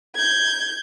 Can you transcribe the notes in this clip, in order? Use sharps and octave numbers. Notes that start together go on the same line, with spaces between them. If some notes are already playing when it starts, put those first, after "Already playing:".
G6 G#6